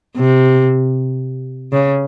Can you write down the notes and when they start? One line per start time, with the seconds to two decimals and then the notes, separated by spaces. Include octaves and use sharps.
0.17 C3
1.72 C#3